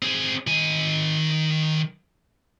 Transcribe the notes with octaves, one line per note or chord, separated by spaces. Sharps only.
C4 G#4
D#3 G#5